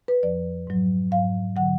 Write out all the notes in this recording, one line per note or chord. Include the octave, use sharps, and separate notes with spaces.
B4
F2 F3 D5
G#2 F#3
G#2 F#3 F5
D3 F#3 F#5